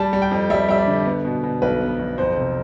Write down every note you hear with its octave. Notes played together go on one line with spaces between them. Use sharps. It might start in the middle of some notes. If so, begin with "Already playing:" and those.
Already playing: G3 A5
G3
G5
F2
G3 E5
G3 E5
D5
D3
B3
B2
B2
B1 B4
B3
B1
F2 C5
C3